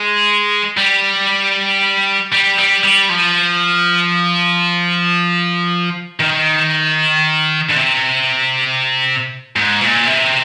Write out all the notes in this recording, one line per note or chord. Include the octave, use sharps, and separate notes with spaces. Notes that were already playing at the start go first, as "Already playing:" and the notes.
Already playing: G#3
G3
G3
G3
G3
F3
D#3
D3
C3
G#2
A#2
C3